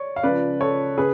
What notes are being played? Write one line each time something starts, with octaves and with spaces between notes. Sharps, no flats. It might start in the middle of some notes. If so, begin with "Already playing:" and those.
Already playing: C#5 D5
F5
C#2 C#3 F3 B4 D5
A4 C#5
C#3 G#4 B4